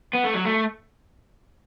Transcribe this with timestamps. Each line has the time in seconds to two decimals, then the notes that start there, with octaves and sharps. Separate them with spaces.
0.13 B3
0.24 A3
0.34 F#3
0.45 A3